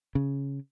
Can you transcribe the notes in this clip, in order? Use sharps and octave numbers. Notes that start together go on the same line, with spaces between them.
C#3